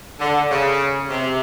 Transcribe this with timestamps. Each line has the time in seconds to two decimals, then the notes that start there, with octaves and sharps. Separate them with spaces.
0.20 D3
0.50 C#3
1.10 C3